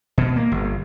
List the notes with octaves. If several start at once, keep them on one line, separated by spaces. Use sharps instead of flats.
B2
A#3
G1